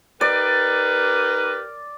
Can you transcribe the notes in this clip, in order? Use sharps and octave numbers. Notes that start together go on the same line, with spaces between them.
D#4 G4 A#4 B4 D5